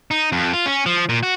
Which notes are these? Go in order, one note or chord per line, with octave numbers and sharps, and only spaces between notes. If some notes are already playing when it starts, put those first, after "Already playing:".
D#4
F2
F4
C#4
F3
A#2
F#4